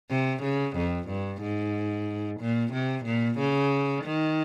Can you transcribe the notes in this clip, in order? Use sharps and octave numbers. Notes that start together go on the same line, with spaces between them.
C3
C#3
F2
G2
G#2
A#2
C3
A#2
C#3
D#3